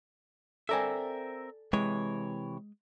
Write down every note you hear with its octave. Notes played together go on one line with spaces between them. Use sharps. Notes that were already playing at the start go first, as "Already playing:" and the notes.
C4 A4 A#4 D5 E5 G#5
C3 E3 G#3 C#5